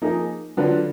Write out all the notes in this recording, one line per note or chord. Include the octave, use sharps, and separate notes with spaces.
F3 A#3 D#4 G#4
D3 F#3 D4 F4 B4